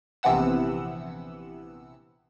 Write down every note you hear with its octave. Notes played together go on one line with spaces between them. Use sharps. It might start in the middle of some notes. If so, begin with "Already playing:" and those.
A#1 C3 E3 B3 F#5 E6